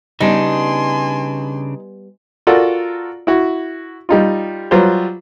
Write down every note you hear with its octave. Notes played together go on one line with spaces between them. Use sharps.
C#3 G3 B3 D4 D#4 G#5 C6
F4 F#4 A4 A#4 D5 F#5
E4 F#4
G3 D#4 F4
F#3 G3 F4 B4 C5